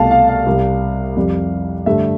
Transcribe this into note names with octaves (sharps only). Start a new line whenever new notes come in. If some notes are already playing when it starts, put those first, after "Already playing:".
Already playing: C2 B2 A3 F5 A5
F5
F5
C2 C3 G3
F2 C3 G3
G2 D3 A3 E5